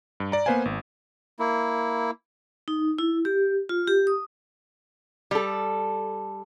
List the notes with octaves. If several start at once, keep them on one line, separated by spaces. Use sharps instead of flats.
G2
D5 A#5
A#3 B3 B4 C5 F5 G#5
G#1
A#3 E4
D#4
E4
G4
F4
G4
D#6
G3 A4